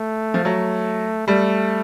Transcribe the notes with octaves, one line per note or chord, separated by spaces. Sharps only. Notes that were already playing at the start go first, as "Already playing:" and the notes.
Already playing: A3
F3
F#3 A3
G3 A3